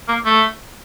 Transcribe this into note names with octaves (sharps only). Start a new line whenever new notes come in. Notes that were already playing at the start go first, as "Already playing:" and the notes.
A#3
A3